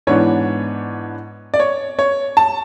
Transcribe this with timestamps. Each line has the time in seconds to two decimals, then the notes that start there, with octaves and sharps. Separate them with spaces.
0.07 G#2 E3 B3 D4 C#5
1.54 D5
1.60 C#5
1.99 C#5
2.37 A5